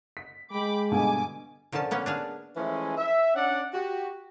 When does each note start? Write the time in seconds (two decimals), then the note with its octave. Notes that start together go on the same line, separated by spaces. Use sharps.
0.17 B6
0.52 G#3 G5 B5 D6
0.92 G2 B2 D3 G#5 D6
1.72 A#2 D3 F3 C#4 A5
1.91 A#3 B3 C#4
2.06 D4 G#4 F5
2.56 E3 F3 G#3 A3 C#4
2.97 E5
3.36 C#4 D4 D5 F#5
3.74 F#4 G4